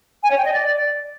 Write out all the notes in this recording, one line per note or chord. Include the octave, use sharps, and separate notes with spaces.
G#5
C#5
G5
D#5
D5